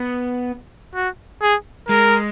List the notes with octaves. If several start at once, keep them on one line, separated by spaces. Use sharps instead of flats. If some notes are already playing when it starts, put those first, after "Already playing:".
Already playing: B3
F#4
G#4
G#3 A#4